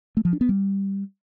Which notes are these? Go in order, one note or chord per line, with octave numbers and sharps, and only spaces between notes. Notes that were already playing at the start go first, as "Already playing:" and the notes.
A3
F3
D4
B3
G3